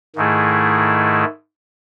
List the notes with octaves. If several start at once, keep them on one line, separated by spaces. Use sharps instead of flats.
G#2 D#3 A3 E4 G#4